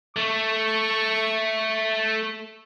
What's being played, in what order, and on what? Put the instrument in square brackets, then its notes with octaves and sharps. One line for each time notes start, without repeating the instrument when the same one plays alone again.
[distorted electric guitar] A3 [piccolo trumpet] C#6